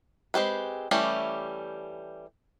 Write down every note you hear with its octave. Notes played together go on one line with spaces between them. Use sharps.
G#3 C4 G4 B4
E3 G3 A3 C#4 G4